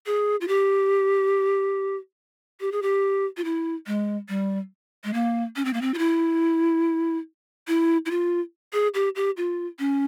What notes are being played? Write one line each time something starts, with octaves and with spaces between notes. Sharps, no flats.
G#4
F4
G4
G4
G#4
G4
F4
E4
G#3
G3
G#3
A#3
C#4
C4
A#3
C4
F4
E4
E4
E4
F4
G#4
G4
G4
F4
C#4